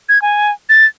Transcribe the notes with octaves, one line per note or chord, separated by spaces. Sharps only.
G#6
G#5
A6